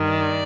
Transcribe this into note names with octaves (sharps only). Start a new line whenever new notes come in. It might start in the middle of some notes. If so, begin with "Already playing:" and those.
Already playing: G2 D#3
D5